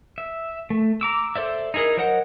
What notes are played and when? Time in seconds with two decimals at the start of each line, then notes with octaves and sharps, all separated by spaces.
0.18 E5
0.70 A3
1.01 A#5 D6 E6
1.36 A4 C5 D5 E5
1.74 D#4 E4 G#4 A#4 D#5
1.97 F#3 A#4 C5 D#5 F#5